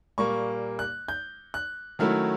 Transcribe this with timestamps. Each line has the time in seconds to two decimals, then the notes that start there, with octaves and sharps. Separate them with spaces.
0.18 A#2 G3 A#3 C#6
0.79 F#6
1.08 G6
1.54 F#6
1.99 D#3 F#3 A3 C#4 E4 F6